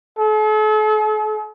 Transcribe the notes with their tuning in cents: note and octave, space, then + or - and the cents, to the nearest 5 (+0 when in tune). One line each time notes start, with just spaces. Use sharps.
A4 -45